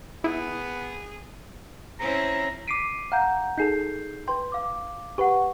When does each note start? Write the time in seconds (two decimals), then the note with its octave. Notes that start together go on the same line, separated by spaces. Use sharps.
0.24 B3 E4 G#4
2.00 C4 C#4 E4 A#5
2.68 D6 B6 C7 D7 D#7
3.12 F5 F#5 A#5 G6
3.58 D#4 G#4 A4 G6 C7
4.28 B4 G5 C6
4.52 F5 D6
5.18 G4 B4 F#5 C#6